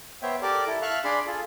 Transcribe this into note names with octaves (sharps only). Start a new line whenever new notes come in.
B3 C5 C#5 E5 G5
G4 A4 A#4 D5 A5 D6
E4 A4
E5 F5 A5 C#6 F6 F#6
D4 G#4 D5 B5 C6
F4 G#4 A4